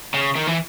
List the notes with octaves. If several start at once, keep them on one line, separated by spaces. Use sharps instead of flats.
C#3
D#3
E3